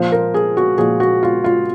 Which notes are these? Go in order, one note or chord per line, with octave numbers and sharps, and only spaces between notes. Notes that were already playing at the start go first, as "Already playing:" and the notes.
Already playing: A#2 F3 C5
A#4
G#4
F#4
A#2 F3 G#4
F#4
F4
F4